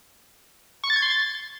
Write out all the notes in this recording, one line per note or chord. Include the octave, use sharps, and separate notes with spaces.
C#6
A6
G#6
C6
A6